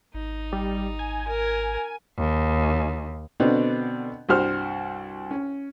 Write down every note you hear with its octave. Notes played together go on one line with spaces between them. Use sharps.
G#1 D#4
G3
G#5
A#4
D#2
B2 D3 B3 C4 D4
C2 G2 F#4 C5 F6
C#4